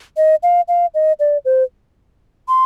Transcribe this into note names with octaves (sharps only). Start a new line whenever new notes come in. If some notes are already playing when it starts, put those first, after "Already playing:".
D#5
F5
F5
D#5
D5
C5
C6